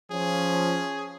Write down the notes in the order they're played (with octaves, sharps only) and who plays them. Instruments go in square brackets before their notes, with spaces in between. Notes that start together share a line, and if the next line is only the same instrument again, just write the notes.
[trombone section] F3 C#4 F4 [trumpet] G#4